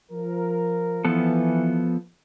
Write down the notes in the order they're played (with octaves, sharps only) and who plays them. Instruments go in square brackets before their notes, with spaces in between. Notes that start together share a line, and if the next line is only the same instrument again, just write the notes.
[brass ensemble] F3 A#4
[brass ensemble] E3 [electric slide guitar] F3 B3 A4